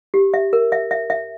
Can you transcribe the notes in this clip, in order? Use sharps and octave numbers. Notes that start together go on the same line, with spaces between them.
G4
E5
A#4
E5
E5
E5